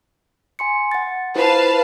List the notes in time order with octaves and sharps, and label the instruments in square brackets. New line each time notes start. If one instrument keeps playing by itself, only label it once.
[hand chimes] G#5 C6 C#7
F#5 A6
[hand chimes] E4 F4 C5 [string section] B4 F5 A5